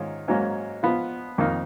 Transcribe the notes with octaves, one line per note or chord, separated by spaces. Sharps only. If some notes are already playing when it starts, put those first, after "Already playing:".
Already playing: G#2 D#3 C#4 F4
G#2 F#3 A#3 C#4
F3 B3 F4
F2 D#3 A#3 D#4